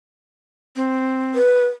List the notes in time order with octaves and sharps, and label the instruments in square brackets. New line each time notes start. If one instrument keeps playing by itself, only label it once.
[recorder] C4
[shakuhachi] B4